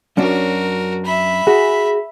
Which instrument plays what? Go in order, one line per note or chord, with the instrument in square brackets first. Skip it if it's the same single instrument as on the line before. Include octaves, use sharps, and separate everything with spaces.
[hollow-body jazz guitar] F#2 C#4 D4 [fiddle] F#4 A#4
[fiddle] E5 B5
[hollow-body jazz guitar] F#4 [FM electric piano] G#4